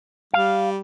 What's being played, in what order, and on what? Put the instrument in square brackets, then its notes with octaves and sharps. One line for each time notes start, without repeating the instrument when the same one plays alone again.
[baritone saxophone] G3 [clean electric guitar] F5